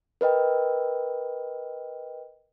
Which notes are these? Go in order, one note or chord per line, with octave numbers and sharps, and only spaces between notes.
A#4 B4 D#5 G5